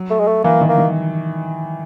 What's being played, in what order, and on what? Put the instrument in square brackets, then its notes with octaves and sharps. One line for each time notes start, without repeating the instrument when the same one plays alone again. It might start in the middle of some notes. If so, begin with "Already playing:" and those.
Already playing: [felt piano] F#3
[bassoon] A3
G#3
A3
[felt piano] E3 [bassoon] A#3
[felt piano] D#3
[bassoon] A#3
[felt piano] D#3